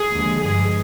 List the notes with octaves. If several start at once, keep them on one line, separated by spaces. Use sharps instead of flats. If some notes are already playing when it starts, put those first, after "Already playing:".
Already playing: G#4
D#2 D3 F3 G#3
G2 F3 G#3 G#4